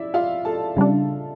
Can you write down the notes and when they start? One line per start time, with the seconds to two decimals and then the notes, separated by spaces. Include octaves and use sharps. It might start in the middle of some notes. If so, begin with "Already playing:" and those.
Already playing: E4 D5 E5
0.14 F4 F5
0.45 A4 A5
0.77 C#3 G3 D4